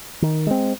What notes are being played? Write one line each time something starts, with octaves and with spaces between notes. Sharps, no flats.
D#3
G#3 C4